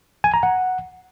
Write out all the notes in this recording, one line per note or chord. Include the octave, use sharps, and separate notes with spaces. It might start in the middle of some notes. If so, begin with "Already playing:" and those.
G#5
A#5
F#5